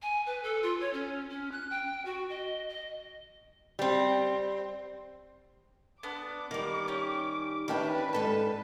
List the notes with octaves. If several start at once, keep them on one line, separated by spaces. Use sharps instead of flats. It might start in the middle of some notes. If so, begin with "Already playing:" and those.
G#5
B4
A4
F4
C#5
C#4
C#4
F#6
G5
F#4
D#5
D#5
G3 C4
B3 D4 D6
D#3 G3 A#3
C#4 G4
D#3 C#4 D4 G4 B4 E5 G5
G#2 A4 A5